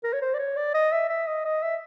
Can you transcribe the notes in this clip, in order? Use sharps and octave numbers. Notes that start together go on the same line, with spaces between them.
A#4
C#5
C5
D5
C#5
D5
D#5
E5
E5
D#5
D#5
E5